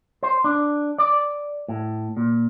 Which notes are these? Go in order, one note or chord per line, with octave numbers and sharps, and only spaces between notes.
C5
D4
D5
A2
A#2